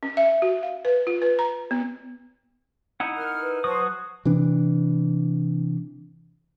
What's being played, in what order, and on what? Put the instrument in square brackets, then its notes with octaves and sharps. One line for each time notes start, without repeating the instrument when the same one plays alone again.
[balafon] C#4
E5
F#4
F5
B4
F4
B4
A#5
B3
[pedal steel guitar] D#4 E4 F#5
[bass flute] A#4 [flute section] F6
[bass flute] B4
[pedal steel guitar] F#3 F#4 D#6 [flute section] C5 A5 C#6
[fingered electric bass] C3 E3 D4